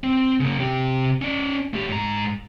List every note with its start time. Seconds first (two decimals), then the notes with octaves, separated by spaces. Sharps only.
0.04 C4
0.40 C#3 A#3
0.59 C3 G4
1.22 C#4 D5
1.73 A3 G4
1.89 G#2 A#5